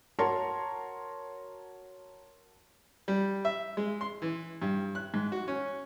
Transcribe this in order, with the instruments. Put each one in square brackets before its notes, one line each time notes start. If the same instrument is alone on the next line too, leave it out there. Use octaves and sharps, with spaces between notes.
[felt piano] F#4 A#4 C#5 A5 A#5 C6
[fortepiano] G3
E5
G#3
C6
E3
G2
F#6
G#2
F#4
C#4